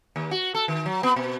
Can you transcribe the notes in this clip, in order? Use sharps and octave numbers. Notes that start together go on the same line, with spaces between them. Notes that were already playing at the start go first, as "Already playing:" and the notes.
D#2
F#4
A4
D#3
F#3
B3
B2